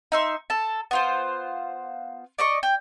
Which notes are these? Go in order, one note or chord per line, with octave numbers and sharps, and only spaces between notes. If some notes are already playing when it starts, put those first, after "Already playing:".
D#4 E5 C6
A4 A5
B3 F4 C5
D5 D#5 C#6
G5